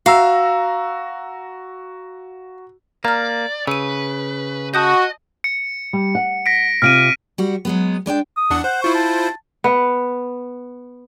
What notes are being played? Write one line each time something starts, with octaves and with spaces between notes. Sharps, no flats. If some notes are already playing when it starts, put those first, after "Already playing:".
F#4 F5 A#5 E6
A#3 D5 A#5 F6
C#3 B4 E6 D#7
F#4 D#5 A5 D#6 G6
C#7
G3
F#5
A#6 B6 D7
C3 F4 F6 D7 D#7
G3 F#4
F#3 G#3 B3
G#3 D4 D5 G5
D#6
E2 D4 F#5
C5 F#5
E4 F4 C5 C#6
A5
B3